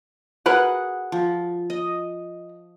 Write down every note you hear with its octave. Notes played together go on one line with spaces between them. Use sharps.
F#4 G#4 A#4 B4 F#5
F3
D#5